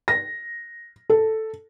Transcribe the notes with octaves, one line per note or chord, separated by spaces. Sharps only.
A#6
A4